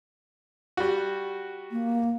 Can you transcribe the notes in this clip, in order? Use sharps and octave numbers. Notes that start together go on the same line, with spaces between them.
G3 F#4
A#3